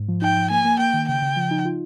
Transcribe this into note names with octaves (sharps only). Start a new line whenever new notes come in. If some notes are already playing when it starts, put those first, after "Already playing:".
Already playing: G#2
F3
D#4 G5
F3
A#3 G#5
A#3
A#3 G5
D#3
C#3 G5
C#3
F3
D#4
F4